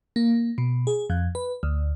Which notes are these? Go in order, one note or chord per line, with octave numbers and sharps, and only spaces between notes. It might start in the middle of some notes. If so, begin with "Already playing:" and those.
A#3
B2
G#4
F2
B4
D2